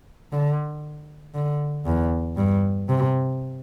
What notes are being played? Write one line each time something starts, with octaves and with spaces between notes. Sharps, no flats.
D3
D3
E2
G2
C3